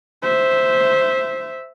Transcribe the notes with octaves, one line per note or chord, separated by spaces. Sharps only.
C5 E5